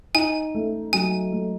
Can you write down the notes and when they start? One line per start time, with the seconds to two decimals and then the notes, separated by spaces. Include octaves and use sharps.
0.14 D#4 G#5
0.55 A3
0.93 F#3 G#5
1.32 A3